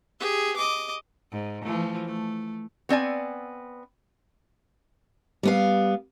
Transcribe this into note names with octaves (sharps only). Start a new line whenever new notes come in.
G4 G#4
D#5 D6
G#2
E3 F3 A3
A3
B3 C4 D5 G#5
G3 B3 F5